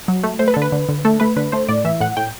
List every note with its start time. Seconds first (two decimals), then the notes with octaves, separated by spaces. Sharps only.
0.08 F#3
0.23 A3
0.39 A3 C5
0.48 B4
0.54 A4
0.56 D3
0.62 B4
0.72 D3
0.89 D3
1.05 A3 A4
1.20 A3 B4
1.36 D3 B4
1.52 A3 C5
1.69 A2 D5
1.85 E3 E5
2.00 A2 F#5
2.17 A2 G5